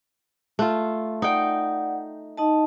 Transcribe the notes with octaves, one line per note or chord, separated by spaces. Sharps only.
A3 F4
D#4 D5 F#5 G5
D#4 D#5 A5